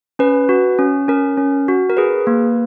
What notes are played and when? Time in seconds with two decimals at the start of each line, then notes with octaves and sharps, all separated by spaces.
0.19 C#4 B4
0.49 F#4
0.78 C#4
1.08 C#4 A#4
1.38 C#4
1.68 F#4
1.90 A#4
1.97 G#4 B4
2.27 A#3